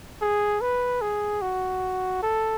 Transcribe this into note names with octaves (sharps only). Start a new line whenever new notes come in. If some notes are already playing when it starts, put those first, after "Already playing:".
G#4
B4
G#4
F#4
A4